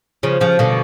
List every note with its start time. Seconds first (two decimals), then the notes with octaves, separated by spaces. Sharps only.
0.23 C#3 F3
0.41 C#3 F3
0.59 B2 D3